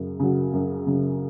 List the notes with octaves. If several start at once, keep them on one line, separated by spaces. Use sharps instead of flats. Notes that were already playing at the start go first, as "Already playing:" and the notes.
Already playing: F#2 C#3
C#3 F#3
F#2
C#3 F#3